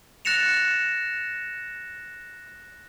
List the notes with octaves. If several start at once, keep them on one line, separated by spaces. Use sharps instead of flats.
F#6 A6 A#6 C#7 E7 F7